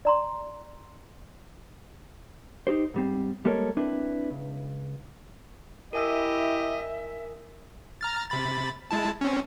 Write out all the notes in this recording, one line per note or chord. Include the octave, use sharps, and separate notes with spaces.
D5 A#5 C6
D#4 F#4 G4 C5
G#2 G3 C4
G3 G#3 A#3 A4 A#4 C#5
C4 D4 E4 B4
C#2
E4 G4 A#4 D#5 E5 G#5 E6
A#5 F6 A6
C3 B5 A6
G#3 E4 A5
C4 C#4